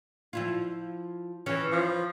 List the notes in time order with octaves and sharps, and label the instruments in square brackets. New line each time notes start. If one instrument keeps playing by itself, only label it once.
[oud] F3 E4 F4
[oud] E3 [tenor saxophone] C#4
[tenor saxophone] F3